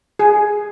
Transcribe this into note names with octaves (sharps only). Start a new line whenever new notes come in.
G#4